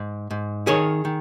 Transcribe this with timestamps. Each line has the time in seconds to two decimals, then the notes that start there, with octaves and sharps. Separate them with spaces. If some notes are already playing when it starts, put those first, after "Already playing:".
Already playing: G#2
0.31 G#2
0.67 D#3 G#4 C#5
1.05 D#3